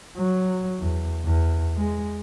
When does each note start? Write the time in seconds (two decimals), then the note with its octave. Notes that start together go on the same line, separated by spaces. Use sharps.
0.17 F#3
0.79 E2
1.25 E2
1.77 G#3